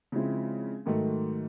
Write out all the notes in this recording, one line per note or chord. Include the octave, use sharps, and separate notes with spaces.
C#3 F3 G#3 C4 E4
G#2 D#3 F#3 A3